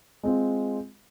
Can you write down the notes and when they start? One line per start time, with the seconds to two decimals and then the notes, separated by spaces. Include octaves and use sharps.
0.23 G#3 C4 F4